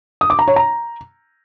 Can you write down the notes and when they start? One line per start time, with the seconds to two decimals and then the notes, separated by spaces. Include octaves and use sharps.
0.21 D#6
0.30 D6
0.39 A#5
0.48 C#5
0.56 A#5